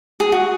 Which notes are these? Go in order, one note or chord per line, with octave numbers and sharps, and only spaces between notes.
G#4
F#4